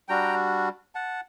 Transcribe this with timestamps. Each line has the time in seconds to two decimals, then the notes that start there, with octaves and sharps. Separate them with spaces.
0.08 G3 D4 F#4 G5 A#5
0.95 F#5 A5